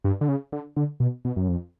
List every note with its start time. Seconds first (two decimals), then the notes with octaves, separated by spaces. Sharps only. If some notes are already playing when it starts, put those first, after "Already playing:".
0.04 G2
0.21 D3
0.28 C#3
0.52 D3
0.77 D3
1.00 B2
1.25 B2
1.36 F#2
1.49 F2